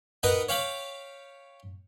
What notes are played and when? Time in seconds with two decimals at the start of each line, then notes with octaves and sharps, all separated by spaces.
0.23 D#4 A#4 B4 D#5 F#5 G5
0.48 C#5 F5 G5 B5 D6